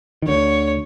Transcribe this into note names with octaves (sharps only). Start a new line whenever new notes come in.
D#3
D2 D3 C#5